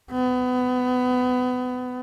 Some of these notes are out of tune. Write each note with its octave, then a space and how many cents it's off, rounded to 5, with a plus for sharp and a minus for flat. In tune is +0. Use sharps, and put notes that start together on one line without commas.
B3 +25